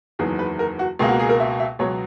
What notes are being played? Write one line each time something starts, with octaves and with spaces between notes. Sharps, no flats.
F#1 E2 D#3 F#3 B3 G#4
B4
A#4
F#4
C#2 B2 A#3 G#4
F#4
G#4
A#4
E5
E5
C#2 B2 F#3 B3 C#5